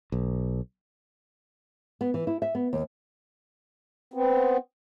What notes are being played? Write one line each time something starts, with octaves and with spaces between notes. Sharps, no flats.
B1
B3
E3
E4
E5
B3
D#2
B3 C4